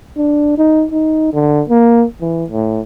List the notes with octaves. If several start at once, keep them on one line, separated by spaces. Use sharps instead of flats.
D4
D#4
D#4
D3
A#3
E3
A2